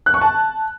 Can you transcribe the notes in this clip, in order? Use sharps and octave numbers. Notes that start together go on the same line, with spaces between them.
F#6
C#6
A5